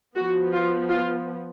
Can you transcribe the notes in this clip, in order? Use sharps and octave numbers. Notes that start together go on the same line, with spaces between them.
F3 B3 F#4
F4
F4